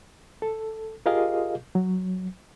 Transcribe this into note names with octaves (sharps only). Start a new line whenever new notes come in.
A4
F4 G4 G#4 A#4 D#5 F5
F#3